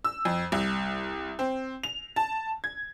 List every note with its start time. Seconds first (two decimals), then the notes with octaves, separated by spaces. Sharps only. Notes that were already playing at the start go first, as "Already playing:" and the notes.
0.04 E6
0.25 F2
0.52 C2
1.39 C4
1.83 F7
2.16 A5
2.64 G#6